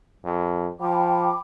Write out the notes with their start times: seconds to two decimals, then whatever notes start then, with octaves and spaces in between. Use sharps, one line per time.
0.24 F2
0.80 F3 G5 B5 D6